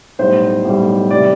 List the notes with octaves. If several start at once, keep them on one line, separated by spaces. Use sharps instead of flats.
B1 A2 G3 C5
B1 A2 G3
C3 E3 G3 D5